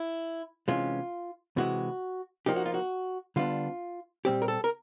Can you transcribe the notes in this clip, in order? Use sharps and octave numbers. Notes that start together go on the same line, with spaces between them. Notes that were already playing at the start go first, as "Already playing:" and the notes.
Already playing: E4
C3 E3 G#3 C#4 F4
C3 E3 G#3 F#4
F3 A#3 D#4 G4
F#4
F4
F#4
D3 G3 B3 D4 F4
A#2 G3 C4 G4
A#4
A4
A#4